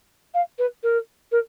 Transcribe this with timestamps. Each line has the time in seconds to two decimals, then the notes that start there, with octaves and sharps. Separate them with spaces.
0.34 F5
0.58 B4
0.83 A#4
1.31 A#4